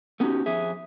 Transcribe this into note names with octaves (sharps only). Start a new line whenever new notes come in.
A3 B3 C#4 D#4 F#4 G4
F2 G#4 E5